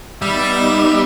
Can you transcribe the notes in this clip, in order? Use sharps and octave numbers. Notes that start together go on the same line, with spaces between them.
G3 B3 D#4 E5 B5